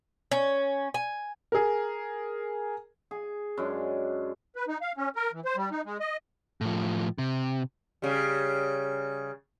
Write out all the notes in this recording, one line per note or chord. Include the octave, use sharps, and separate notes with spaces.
C#4
G#5
G#4 A#4
G#4
F#2 G#3 D4
B4
D#4
F5
C#4
A#4
E3
C5
G3
D#4
G#3
D#5
A2 F3
C3
C#3 G3